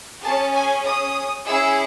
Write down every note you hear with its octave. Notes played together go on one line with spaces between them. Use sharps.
C#4 G#4 A5
G#5
D#6
C#4 E4 G#4 E6